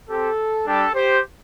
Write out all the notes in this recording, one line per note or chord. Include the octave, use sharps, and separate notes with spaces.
C4 G4 A4
G3 D4 G4 A4
G4 C5